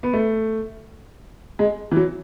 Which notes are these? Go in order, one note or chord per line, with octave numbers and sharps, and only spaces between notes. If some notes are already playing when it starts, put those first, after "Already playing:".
B3
A3
G#3
E3
F#3